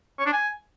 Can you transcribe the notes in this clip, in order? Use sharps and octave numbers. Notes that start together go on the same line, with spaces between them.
C#5
D4
G#5